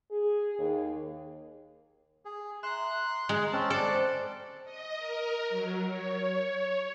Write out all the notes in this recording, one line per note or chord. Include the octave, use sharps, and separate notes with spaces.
G#4
D#2
G#4
E5 A#5 C6 F#6
A#5
G#3
C4 C#4 A5
A4 C5 D5 D6 F#6
D#5
A#4
F#3
C#5